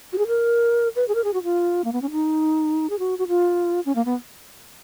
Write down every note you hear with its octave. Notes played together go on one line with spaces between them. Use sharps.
F#4
G#4
A#4
B4
G#4
A#4
G#4
F#4
F4
A#3
B3
C#4
D#4
G#4
F#4
F#4
F4
C#4
A#3
B3